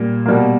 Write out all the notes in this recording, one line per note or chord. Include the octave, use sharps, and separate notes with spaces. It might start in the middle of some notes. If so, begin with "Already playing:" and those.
Already playing: A#2 G3 A#3
B2 G3 A#3